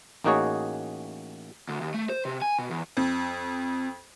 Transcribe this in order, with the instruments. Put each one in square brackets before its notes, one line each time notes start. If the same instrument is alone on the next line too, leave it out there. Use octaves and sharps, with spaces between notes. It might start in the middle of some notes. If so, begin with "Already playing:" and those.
[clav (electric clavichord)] A1 A#3 D#4 F#4 G#4 C#5
[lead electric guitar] D2
D#2
A3
C5
C3
G#5
B2
E2
[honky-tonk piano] F2